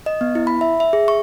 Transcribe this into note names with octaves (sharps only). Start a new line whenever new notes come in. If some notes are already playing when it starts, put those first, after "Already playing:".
D#5
B3
E4
B5
E5
E5
G#4
C#6